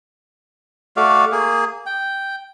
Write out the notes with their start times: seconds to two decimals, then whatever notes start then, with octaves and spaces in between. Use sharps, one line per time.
0.97 A3 F#4 D5 F5
1.32 A#3 G#4
1.86 G5